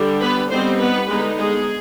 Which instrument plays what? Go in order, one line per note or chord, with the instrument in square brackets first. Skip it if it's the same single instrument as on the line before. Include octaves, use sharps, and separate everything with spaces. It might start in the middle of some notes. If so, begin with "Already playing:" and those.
Already playing: [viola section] D3 G3 D4
B3 B4
G3 B3 C4 D#4 C5
B3 B4
D3 G#3 B3 D#4
G#3 G#4